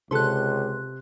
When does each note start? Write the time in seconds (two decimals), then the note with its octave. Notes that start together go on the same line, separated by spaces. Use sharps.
0.11 C#2 C3 A4 B4 C6 F#6